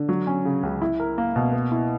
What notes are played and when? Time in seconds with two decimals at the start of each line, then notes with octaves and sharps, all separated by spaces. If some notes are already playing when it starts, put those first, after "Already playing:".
Already playing: D3
0.09 F#3
0.27 C#4
0.45 C#3
0.63 C#2
0.82 E4
1.00 A#4
1.18 A#3
1.36 B2
1.53 B3
1.72 E4